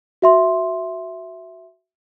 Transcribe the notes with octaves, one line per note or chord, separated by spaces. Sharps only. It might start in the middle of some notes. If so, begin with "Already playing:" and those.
F#4 E5 C6